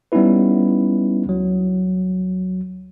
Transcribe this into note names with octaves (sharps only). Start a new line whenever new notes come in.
G3 B3 C#4 D#4 E4 B4
C#2 F#3